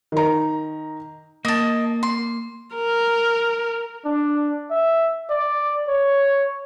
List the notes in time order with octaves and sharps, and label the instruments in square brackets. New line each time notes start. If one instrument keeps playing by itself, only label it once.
[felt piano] D#3 A#5
[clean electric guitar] A#3 [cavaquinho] D#5 A5
[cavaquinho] C6
[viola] A#4
[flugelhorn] D4
E5
D5
C#5